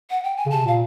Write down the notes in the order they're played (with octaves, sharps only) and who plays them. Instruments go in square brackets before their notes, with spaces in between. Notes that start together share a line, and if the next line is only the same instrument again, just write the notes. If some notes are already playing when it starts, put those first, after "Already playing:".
[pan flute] F#5
G5
G#5
[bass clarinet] C#3
[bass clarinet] C3 [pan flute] A5
[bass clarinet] A#2 [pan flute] F5